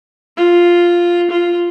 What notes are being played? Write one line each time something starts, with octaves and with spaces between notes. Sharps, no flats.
F4
F4